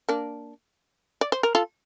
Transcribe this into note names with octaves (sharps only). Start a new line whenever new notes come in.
A#3 D4
D5
C5
A#4
F4 A4